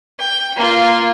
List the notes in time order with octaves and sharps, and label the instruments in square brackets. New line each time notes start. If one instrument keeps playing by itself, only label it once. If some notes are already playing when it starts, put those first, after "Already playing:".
[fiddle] G5
A#3 F4